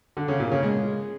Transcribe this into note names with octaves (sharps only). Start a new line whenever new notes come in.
D3
C#3
A#2
C#3
G#3